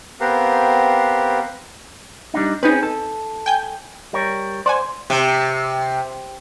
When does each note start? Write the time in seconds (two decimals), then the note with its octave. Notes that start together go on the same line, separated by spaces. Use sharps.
0.20 B3 C4 G4 A#4 F5 F#5
2.34 G3 D4 D#4
2.63 C4 C#4 D#4 G#4 B4
2.83 A4
3.46 G5 G#5 G6
4.13 G3 A#4 C#5
4.66 C5 D5 F#5 G#5
5.10 C3